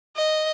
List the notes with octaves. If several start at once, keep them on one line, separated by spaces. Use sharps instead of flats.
D#5